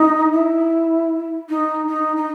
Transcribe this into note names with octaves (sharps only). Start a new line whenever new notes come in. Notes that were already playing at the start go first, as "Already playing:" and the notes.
Already playing: D#4
E4
D#4
D#4
D#4